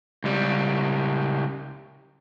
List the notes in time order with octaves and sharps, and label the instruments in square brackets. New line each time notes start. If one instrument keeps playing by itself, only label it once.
[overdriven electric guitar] C#2 G3